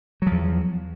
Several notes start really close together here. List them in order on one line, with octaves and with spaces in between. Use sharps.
F#3 F3 E2